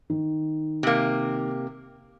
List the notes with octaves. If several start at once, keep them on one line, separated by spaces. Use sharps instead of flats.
D#3
C3 A#3